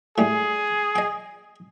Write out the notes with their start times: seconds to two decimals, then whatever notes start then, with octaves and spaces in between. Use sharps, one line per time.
0.18 A2 G3 G#4
0.96 D#5 G5